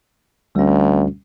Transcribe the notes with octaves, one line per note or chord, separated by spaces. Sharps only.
D2 G3 C#4